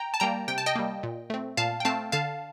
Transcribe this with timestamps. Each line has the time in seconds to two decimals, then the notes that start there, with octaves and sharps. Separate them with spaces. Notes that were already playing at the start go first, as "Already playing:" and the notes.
Already playing: G5 A#5
0.14 A5
0.20 G3 A#3 G5 A#5
0.48 C3 G5
0.58 A5
0.66 D#5 G5
0.75 G3 A#3
1.03 A#2
1.30 A3 C4
1.57 A#2 F5 A5
1.80 G5
1.85 A3 C4 F5 A5
2.12 D3 F5 A5